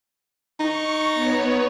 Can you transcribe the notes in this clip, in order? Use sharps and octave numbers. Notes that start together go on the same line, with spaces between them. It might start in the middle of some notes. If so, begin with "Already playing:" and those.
D#4 C#6
B3 C#5